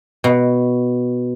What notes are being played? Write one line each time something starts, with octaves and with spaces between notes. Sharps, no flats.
B2